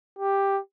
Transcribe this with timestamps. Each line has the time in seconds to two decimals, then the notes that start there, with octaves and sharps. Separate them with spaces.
0.19 G4